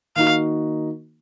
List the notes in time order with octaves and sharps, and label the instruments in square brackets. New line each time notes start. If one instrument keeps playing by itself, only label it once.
[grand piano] D#3 A#3 D#4 F#4 [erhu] F5